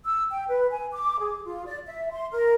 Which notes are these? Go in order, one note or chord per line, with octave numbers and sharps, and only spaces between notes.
E6
G5
B4
G#5
D6
G#4
F4
D5
E5
C6
A#4